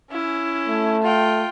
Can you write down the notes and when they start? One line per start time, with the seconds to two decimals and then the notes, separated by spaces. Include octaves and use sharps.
0.10 C#4 E4
0.68 A3
1.02 F4 G5